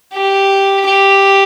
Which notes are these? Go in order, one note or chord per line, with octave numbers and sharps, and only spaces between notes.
G4
G4